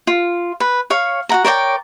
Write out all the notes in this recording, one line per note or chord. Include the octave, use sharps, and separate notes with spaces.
F4
B4
C#5 F5 C#6
F#4 F#5 A#5
A#4 C#5 D5 G5